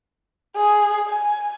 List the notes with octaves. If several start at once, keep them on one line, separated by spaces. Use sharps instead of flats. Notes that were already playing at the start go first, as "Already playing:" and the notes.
G#4
G#5